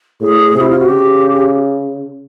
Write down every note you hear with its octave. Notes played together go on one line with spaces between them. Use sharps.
A2 G#4
C3
E4
F4
F#4
C#3 G4